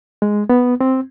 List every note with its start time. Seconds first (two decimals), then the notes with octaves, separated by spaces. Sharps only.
0.22 G#3
0.49 B3
0.81 C4